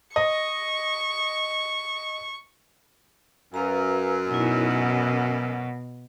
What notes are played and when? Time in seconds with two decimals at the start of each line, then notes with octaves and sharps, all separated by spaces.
0.16 D#5 C#6
3.54 F#2 B4 F5 A#5
4.31 B2 D#4 E4
4.71 F#5